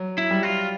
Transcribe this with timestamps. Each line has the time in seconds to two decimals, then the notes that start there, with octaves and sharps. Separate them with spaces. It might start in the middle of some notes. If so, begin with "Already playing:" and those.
Already playing: F#3
0.18 E4
0.31 G3
0.43 F4